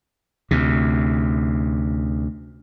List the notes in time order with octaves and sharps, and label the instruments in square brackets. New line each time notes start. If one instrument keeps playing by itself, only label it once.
[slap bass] D2 C3